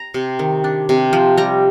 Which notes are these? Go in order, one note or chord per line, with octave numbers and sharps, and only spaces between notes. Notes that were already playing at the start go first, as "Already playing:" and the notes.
Already playing: A#5
C3
D#3
D4
C3
F3
G3 A#5